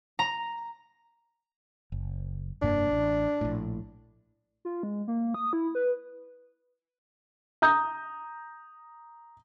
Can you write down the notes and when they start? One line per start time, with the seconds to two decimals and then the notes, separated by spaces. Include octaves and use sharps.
0.19 A#5
1.92 F#1
2.62 F1 G2 A#3 D4
2.91 A1
3.41 A#1 A2
4.65 F4
4.83 G#3
5.08 A#3
5.34 D#6
5.53 E4
5.75 B4
7.62 A#5 D#6 G6